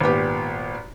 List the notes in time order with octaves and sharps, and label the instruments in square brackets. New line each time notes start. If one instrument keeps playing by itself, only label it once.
[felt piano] G#1 A#2 B3 G4